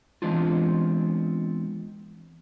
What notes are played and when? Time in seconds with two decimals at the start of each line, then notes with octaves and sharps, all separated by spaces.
0.22 E3 G#3 B3 C4 D4 F4